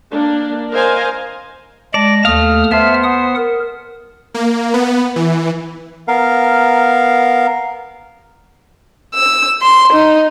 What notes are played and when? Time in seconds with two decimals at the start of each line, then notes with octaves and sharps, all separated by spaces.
0.10 A#3 D4
0.71 A#4 C5 D#5 F5 G#5
1.94 G#3 D5 A5 A#6
2.25 D#2 A3 F5 D#6 F6
2.71 B3 C5 E5 A5 F6
3.03 F#5 D#6
3.36 A#4
4.34 A#3
4.74 B3
5.16 E3
6.08 B3 A#4 F5
9.14 E6
9.62 C6
9.92 D#4